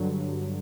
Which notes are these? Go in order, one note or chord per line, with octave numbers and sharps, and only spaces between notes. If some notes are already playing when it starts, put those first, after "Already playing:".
Already playing: G2 D3 F#3